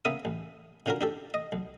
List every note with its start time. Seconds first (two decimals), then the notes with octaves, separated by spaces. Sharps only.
0.05 C#3 A#3 B3 E5 D#6
0.25 A1
0.86 A#2 D3 C#4 F4 F#4 A#4
1.01 D4 G4 A4
1.34 D#5
1.52 B1